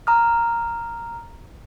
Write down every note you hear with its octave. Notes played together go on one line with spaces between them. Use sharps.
A#5 D#6 F6